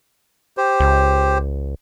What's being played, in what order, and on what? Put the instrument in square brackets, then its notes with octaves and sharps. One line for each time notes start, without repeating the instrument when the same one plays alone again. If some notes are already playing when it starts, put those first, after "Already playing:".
[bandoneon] G4 C5
[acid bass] C#2